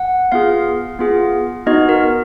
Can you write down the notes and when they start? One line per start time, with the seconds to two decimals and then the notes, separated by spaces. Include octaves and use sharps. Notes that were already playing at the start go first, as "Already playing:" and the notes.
Already playing: F#5
0.32 B3 F4 G#4 F5
0.99 B3 F4 G#4
1.67 B3 D#4 F#4 D#5
1.89 A#4